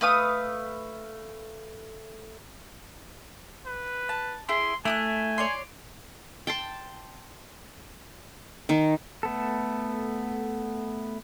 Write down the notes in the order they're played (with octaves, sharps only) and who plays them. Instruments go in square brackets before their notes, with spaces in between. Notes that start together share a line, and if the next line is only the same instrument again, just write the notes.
[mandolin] A3 B4 F5 D#6
[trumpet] B4
[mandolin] A5
[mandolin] E4 G#4 [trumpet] C6
[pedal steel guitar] A3 [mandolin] E4 D#6 F#6 [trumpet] G#5
[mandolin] C#5 D5 C6
[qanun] G5 A5 C6
D#3 D#4
[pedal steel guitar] A3 B3 A4